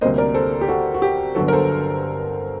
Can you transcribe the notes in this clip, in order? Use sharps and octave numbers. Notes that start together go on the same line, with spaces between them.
D2 C3 G3 A#3 C5 D#5
A#4 D5
A4 C5
G4
F#4 A4
F#4
G4
G1 G2 D3 F#3 F#4 A4
A#4
A4 C5